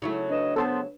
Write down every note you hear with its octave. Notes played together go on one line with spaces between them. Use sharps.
C#3 F#3 A3 D#4 E4
D4 B4 D#5 E7
B3 A4 C5 A5